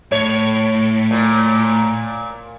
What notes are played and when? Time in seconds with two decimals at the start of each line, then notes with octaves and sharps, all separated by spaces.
0.12 A2 C#5
1.11 A#2